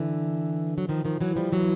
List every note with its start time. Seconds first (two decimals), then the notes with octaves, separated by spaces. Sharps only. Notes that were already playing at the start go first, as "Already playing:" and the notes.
Already playing: D3 E3
0.78 F#3
0.89 D#3 F3
1.05 D#3 F3
1.21 E3 F#3
1.36 F3 G3
1.52 E3 F#3